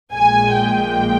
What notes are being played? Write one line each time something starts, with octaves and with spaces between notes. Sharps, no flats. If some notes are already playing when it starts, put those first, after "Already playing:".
A#1 A#2 G#3 G#5
G5